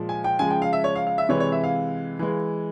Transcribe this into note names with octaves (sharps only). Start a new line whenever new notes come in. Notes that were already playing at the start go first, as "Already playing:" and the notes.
Already playing: A#2 F3 G#3
G#5
G5
C#3 F3 G#3 G#5
G5
F5
E5
C#5
F5
F5
E5
C3 E3 G#3 C#5
C#5
E5
F5
E3 G#3